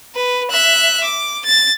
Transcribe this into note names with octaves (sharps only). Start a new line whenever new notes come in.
B4
E5 F#6
D6
A6